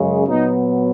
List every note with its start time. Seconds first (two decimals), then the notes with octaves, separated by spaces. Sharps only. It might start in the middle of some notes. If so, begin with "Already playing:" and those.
Already playing: F#2 C#3 G#3
0.28 A#2 F#3 B3 D#4